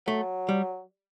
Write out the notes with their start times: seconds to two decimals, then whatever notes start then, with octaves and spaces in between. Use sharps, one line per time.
0.07 F#3 A3
0.49 G3